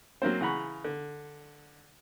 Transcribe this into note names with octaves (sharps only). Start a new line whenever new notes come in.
F#3 A#3 C4 C5
C#3 E3 F#5 A#5 B5 C#6
D3